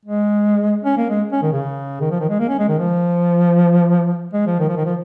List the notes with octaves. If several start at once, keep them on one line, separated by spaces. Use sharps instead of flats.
G#3
C#4
A#3
G#3
C#4
D#3
C#3
D#3
F3
D#3
G#3
A#3
C#4
G#3
D#3
F3
G#3
F3
D#3
F3
D#3
F3